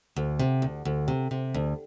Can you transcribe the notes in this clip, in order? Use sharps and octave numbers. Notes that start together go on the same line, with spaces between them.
D2
C3
D2
D2
C3
C3
D2